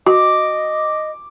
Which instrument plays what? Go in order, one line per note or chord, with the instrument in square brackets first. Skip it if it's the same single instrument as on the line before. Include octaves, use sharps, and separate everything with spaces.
[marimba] F#4 [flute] D#5 [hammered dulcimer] D6